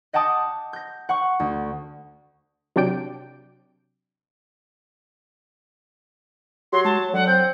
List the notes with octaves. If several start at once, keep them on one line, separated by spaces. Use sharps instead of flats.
D#5 F#5 G5 A5 D6 D#6
G6 A#6
F#5 C#6
D2
C3 F#3 D4 D5 G5 D7
F#3 G4 C6
G#3 A5
C#5
D3 F#3 F#5
C4 G6